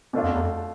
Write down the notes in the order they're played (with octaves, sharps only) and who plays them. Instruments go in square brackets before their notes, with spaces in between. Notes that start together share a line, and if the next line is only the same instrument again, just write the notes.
[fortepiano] B2 A3 D4 F4
[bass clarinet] F2
E2
F2